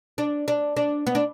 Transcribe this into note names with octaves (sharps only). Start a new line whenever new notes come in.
D4
D4
D4
B3
D4